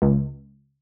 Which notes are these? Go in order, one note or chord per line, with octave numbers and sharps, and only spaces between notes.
C#2